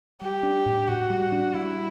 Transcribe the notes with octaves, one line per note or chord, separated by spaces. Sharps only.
G3 G4
D4
A2
A2 F#4
G3
D4
G3 E4